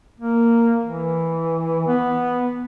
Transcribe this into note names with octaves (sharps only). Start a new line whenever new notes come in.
A#3
E3
B3